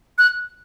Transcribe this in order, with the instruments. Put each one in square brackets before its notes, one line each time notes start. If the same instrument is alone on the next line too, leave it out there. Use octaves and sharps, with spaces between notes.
[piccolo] F#6